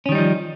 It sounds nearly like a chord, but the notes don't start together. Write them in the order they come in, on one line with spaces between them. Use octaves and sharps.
C#4 D#3 G3 D#4 F3